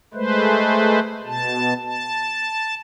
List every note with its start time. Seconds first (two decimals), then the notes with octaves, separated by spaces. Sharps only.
0.14 G#3 A3 B4 C5
1.25 B2 A5
1.84 A5